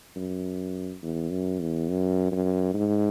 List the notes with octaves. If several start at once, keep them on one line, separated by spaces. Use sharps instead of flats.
F#2
E2
F#2
E2
F#2
F#2
G#2